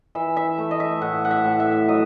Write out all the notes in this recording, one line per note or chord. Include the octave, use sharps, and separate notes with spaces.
E3 E5
E5
A3
D#5
E5
A2 F#5
F#5
E5
A2
E5
F#3 D#5